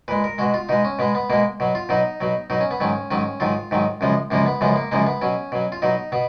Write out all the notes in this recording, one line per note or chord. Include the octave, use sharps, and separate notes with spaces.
A#2 G#3 B4
A#4
B2 G#3 F#4
F4
B2 G#3 D#4
C#4
B2 G#3 B3
B3
B2 G#3 A#3
B2 F#3
F4
B2 F#3 D#4
B2 F#3
B2 F#3 D#4
C#4
B3
G#2 D#3 F#3 C#4
G#2 D#3 F#3 C#4
G#2 D#3 F#3 F4
G#2 D#3 F#3
F#2 C#3 F3 G#3
F#2 C#3 F3 G#3 A#3
B3
F#2 C#3 F3 G#3 B3
A#3
F#2 C#3 F3 G#3 A#3
B3
B2 F#3 C#4
B2 F#3
F4
B2 F#3 D#4
B2 B3